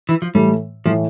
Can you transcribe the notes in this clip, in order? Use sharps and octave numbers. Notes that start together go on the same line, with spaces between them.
E3
F3
A2 E3 G3 A3
A2 E3 F3 A3